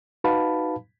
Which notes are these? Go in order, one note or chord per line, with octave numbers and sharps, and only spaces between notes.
D#4 F#4 B4 F5 A5 B5